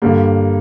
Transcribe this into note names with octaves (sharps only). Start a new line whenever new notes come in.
G2 D3 G3 A#3